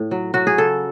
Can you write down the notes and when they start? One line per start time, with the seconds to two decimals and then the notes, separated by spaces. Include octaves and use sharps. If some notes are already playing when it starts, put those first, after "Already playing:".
Already playing: A2
0.11 F#3
0.34 F#3 F#4
0.47 G#4
0.58 C#3 A4